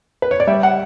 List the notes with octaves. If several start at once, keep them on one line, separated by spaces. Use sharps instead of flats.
B4
C#5
D5
G3 E5
F#5